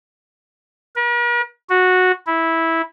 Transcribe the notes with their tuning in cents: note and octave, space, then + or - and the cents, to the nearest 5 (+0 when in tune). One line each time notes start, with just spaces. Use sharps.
A#4 +45
F#4 -10
E4 -10